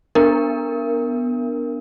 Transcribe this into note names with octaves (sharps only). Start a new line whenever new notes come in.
B3 D4 A#4